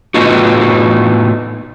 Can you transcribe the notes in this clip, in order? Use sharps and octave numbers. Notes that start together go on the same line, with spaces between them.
A2 A3 B3 D#4 F4 F#4